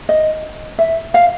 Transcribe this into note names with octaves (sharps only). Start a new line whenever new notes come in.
D#5
E5
F5